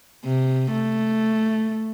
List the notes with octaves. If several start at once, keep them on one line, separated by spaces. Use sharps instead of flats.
C3
A3